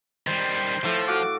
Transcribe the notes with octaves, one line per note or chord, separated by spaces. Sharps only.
D#3 G3 C5
A2 F3 A4
F#4 F5 F#5 D6